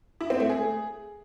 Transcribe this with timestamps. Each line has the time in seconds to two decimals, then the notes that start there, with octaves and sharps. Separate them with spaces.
0.21 E4
0.30 C4
0.40 A3
0.49 G#4